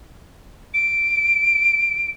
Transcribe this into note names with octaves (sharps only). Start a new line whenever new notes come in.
D7